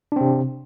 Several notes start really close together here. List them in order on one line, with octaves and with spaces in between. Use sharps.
D4 C4 C3